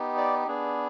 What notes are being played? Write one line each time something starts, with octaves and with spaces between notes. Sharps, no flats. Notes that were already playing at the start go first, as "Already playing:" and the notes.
Already playing: B3 D#4 G4
D5
B3 D4 G#4